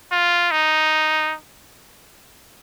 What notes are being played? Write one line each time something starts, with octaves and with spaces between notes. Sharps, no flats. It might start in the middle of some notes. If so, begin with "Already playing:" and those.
F4
D#4